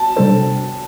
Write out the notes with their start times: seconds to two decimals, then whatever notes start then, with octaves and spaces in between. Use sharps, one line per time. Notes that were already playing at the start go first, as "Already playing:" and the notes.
Already playing: A5
0.16 C3 G3 D4 A4 C5